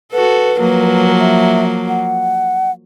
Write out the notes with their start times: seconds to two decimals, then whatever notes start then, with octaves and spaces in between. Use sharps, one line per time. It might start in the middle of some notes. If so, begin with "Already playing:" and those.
0.13 F#4 A4 B4
0.59 F3 F#3 A#3
1.19 E5
1.89 F#5